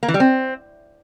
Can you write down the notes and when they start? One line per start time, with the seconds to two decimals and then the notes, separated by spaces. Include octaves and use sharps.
0.03 A#3
0.08 E3
0.14 G3
0.20 C4